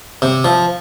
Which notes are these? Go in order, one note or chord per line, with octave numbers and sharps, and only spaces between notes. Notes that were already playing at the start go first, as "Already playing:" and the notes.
C3
F3